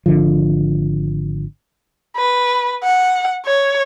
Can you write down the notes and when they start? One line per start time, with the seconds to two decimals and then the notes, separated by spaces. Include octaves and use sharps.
0.06 G#1 D3 F3
2.17 B4
2.84 F#5
3.46 C#5